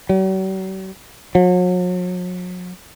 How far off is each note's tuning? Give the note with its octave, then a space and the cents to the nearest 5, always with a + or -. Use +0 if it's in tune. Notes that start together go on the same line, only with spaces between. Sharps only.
F#3 +45
F#3 -40